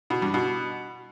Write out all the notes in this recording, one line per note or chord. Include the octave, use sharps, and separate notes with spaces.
B2
G2
B2